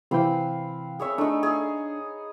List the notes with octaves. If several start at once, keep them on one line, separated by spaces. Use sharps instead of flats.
C3 E3 C4 B4 F5 G5
G#4 C#5 E5
A3 D4 D#4
G#4